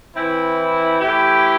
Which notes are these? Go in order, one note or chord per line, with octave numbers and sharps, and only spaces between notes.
E3 C4 E4
E3 A3 E4 G4